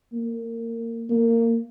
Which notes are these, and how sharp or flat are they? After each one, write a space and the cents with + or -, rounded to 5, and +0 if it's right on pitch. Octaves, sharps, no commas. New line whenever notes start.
A#3 -25
A#3 -25